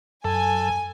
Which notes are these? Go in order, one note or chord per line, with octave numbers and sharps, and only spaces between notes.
F#2 A4 G#5